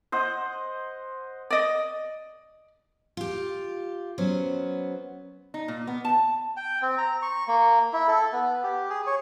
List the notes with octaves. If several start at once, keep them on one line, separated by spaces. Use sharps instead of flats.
C5 D#5 F#5
D5 D#5
F4 G4
F#3 B3 C#4 C5
D#4
A#2
B3
A5
G5
C4
A#5
C#6
A#3
E4
A4
B3
G4
G#4
C#5